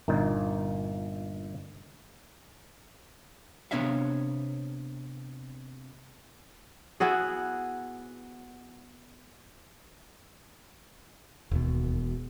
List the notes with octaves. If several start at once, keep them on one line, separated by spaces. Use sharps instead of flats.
G1 A#2 A#3 D#4
C3 B3 D4 C#5 E5 F5
B3 E4 F#4 G#4
E1 D#2 B2